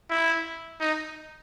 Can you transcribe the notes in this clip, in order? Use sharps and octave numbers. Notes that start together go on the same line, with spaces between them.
E4
D#4